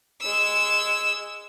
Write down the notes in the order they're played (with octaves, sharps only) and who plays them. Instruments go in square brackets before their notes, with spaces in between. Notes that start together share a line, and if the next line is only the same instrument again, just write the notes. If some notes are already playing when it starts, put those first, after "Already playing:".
[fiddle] G#3 E6